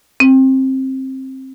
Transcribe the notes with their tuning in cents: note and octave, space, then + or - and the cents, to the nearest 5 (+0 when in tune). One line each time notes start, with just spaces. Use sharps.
C4 +20